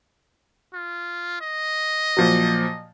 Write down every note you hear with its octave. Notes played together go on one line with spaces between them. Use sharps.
F4
D#5
A#2 F3 F#3